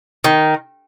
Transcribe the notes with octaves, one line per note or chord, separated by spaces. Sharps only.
D#3